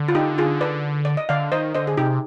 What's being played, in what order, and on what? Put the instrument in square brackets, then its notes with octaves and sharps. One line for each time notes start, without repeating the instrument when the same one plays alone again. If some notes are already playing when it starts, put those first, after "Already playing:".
Already playing: [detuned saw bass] D3
[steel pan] F4
D#4 G4
F4 G#4
B4 D5
D5
D#5
[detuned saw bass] D3 [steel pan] D5 F5
[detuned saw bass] D#3 [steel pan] C5 D#5
[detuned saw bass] D3 [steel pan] C5 D#5
[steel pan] G#4
[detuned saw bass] C3 [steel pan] D#4 G4